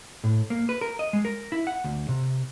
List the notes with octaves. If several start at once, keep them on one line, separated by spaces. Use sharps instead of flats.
A2
A#3
B4
A#4
D#5
G#3
A#4
E4
F#5
D2
C3